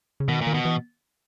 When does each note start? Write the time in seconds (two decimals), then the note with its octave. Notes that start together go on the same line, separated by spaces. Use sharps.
0.20 C#3
0.28 B2 D#3
0.41 A#2
0.47 D#3
0.54 B2
0.65 E3